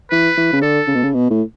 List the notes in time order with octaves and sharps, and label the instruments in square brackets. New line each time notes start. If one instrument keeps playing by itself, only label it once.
[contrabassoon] E3 [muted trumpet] B4
[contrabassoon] E3
C#3
[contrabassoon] D3 [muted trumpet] A4
[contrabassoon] C#3
B2
C#3
B2
A2